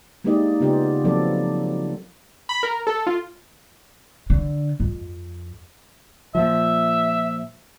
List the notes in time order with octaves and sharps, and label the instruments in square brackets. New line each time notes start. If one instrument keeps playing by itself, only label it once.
[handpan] G#3 A#3 D#4 G4 D5 D#5
C#3 B3 C#4 F4 G4 D5
F3 F#3 A#3 C4 A4 D5
[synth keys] B5
A#4
A4
F4
[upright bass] D3
F2
[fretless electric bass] A#2 F3 [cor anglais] E5